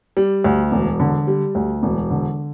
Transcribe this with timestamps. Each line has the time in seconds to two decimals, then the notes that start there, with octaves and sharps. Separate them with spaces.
0.17 G3
0.44 D2
0.72 E1
1.00 D3
1.27 G3
1.55 D2
1.83 E1
2.10 D3